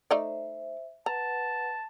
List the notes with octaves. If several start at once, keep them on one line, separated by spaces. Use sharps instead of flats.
A3 D#4 C5 D5 E5
B4 F#5 A5 A#5